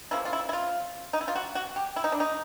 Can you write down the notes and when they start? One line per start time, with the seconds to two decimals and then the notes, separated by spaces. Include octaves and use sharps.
0.11 C#3 F3 A#3 E4
0.25 F4
0.33 E4
0.49 E4
0.53 F4
1.13 D#4
1.21 E4
1.28 F4
1.35 F#4
1.55 F#4
1.76 G4
1.96 E4
2.04 D#4
2.12 D4
2.20 D#4